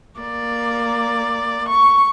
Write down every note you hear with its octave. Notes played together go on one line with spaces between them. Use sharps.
A#3 D5
C#6